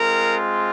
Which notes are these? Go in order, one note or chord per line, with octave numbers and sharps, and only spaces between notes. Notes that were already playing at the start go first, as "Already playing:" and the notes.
Already playing: G#3 C4 F4 A#4